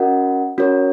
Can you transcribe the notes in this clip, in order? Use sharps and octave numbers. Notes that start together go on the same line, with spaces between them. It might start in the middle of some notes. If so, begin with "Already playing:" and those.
Already playing: C#4 F#4 A#4 D#5 F#5
C#4 F#4 A#4 C#5